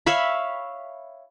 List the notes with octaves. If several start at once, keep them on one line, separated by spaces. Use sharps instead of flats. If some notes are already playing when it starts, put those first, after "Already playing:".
C#5 E5 F5 B5